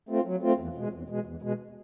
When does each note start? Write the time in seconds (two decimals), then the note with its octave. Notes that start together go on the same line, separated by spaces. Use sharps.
0.09 A3 C4 F4
0.26 F#3
0.42 A3 C4 F4
0.59 E2
0.75 B2 G#3
0.92 E2
1.09 B2 G#3
1.26 E2
1.42 B2 G#3